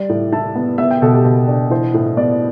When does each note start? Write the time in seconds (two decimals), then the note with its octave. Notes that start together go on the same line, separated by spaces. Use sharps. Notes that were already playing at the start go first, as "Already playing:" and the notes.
Already playing: G3 D5
0.09 A2
0.32 E4 A5
0.55 B3
0.78 B3 E5
0.91 G5
1.02 B2 A4
1.14 G4
1.25 B2
1.48 D4
1.70 E3 C5
1.94 A2
2.17 B3 D5